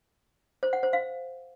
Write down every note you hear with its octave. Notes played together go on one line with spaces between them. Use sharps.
C5
F#5
C5
F5